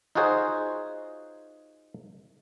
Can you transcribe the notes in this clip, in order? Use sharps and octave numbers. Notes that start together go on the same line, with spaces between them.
D#4 F4 F#4 G#4 C5 C#5